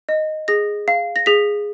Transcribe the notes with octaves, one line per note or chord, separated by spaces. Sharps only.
D#5
G#4 A#6
F5
A#6
G#4 B6